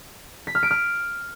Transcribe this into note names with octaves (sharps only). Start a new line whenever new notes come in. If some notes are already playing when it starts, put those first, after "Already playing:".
B6
F6
D7
F6